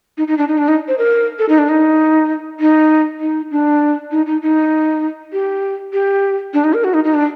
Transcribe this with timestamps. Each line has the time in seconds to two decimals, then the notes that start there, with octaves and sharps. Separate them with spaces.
0.18 D#4
0.28 D#4
0.38 D4
0.48 D#4
0.58 D4
0.68 D#4
0.88 C5
0.98 A#4
1.39 A4
1.49 D#4
1.58 D4
1.69 D#4
2.60 D#4
3.20 D#4
3.51 D4
4.11 D#4
4.27 D#4
4.42 D#4
5.33 G4
5.93 G4
6.54 D4
6.64 D#4
6.74 A#4
6.84 F#4
6.94 D#4
7.04 D#4
7.14 D4